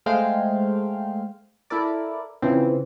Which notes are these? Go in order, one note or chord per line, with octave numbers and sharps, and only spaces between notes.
G#3 A3 C5 F5 G5
E4 A4 A#4 D5
C#3 E3 F3 C4